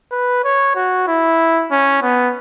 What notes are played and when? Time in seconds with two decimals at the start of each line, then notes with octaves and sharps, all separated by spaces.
0.11 B4
0.44 C#5
0.75 F#4
1.07 E4
1.71 C#4
2.02 B3